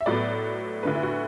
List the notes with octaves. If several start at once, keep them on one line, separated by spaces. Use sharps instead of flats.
E5
A2 F#3 B3 D5
D2 D3 A3 B4
E4
F#4